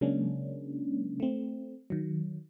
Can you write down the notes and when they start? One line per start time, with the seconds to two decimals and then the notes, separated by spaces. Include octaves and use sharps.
0.01 C#3 F#3 G#3 A#3 C#4 D4
1.20 A3 C4
1.90 D#3 F#3